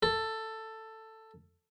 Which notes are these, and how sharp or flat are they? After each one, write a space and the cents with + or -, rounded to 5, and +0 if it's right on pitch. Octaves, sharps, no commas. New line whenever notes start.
A4 +10